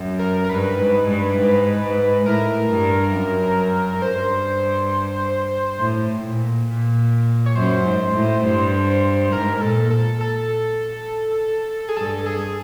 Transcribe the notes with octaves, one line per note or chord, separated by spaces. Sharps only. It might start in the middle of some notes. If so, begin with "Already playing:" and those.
Already playing: F#2
A#4
A#4
G2 B4
G#2
G2
G#2
G#2
A2 A#4
G2
F#2
G2 C5
A2
A#2
A#2
C#5
F#2 C5
G#2
A2
G2
G#2 A#4
A#4
A#2 A4
A4
A4
G#4
G2 A4
G#4